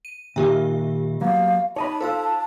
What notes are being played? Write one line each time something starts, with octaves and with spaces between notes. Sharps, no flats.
D#7
A#2 D#3 A#3 F4 G4 E5
F#3 A#3 B3 F5
D#4 C#5 D#5 A5 B5
F4 A4 C5 F5 E6